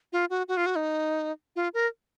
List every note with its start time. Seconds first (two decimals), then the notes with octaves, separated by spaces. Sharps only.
0.13 F4
0.30 F#4
0.48 F#4
0.57 F4
0.66 F#4
0.76 D#4
1.56 F4
1.74 A#4